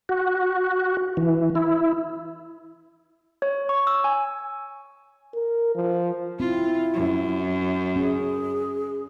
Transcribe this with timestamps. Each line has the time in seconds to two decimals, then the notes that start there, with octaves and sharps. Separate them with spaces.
0.09 F#4
1.17 E3
1.55 E4
3.42 C#5
3.69 C#6
3.87 E6
4.04 G#5
5.35 A#4
5.75 F3
6.40 C4 E4 F4
6.94 F#2
7.96 C#4 G#4